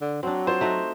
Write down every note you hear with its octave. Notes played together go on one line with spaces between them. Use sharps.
D3
F#3 C4 D4
F4 C5
A3 D#4 F#4